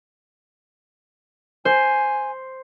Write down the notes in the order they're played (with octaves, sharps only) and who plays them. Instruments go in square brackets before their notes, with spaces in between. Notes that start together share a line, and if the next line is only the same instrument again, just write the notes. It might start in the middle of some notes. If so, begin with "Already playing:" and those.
[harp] C5 [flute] G#5